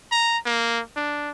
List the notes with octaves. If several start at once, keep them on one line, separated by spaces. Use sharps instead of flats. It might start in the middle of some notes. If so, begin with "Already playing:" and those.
A#5
A#3
D4